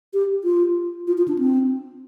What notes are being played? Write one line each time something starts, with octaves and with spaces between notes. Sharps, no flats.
G4
F4
F4
F4
D4
C4